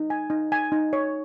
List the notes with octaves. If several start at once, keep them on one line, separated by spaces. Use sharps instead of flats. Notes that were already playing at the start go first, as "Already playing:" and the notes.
Already playing: D#4
G#5
D#4
G#5
D#4
C#5